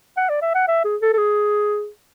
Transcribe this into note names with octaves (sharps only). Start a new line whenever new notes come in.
F#5
D5
E5
F#5
E5
G#4
A4
A4
G#4